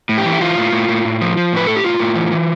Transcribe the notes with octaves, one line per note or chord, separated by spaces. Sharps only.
A2
G4
E3
E4
E3 F4
A2
A2
A2
A2
F3
F3
A2 B4
A2 A4
G4
A2 F4
A2
E3
E3